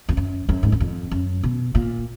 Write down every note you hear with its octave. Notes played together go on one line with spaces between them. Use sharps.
F2
F#2
F#2
G#2
F#2
F2
F#2
B2
A#2